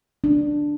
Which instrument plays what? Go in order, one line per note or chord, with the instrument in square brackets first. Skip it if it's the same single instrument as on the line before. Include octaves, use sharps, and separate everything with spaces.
[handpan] D4